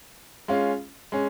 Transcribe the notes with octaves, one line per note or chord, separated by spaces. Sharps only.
G#3 C#4 F4
G#3 C#4